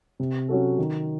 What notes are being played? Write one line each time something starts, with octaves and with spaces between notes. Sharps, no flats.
C3
F#3 C#4 F#4 A4
D#3